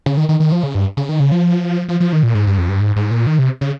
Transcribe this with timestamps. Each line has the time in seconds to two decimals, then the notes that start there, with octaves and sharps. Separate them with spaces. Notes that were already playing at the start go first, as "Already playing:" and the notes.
0.06 C#3
0.17 D#3
0.29 D#3
0.40 D#3
0.52 F3
0.63 C#3
0.75 G2
0.97 C#3
1.09 D#3
1.20 C#3
1.32 F3
1.89 F3
2.00 F3
2.13 D#3
2.23 A#2
2.35 G#2
2.47 G2
2.58 F2
2.69 G2
2.81 G#2
2.96 G#2
3.11 A#2
3.27 D#3
3.39 C3
3.61 C#3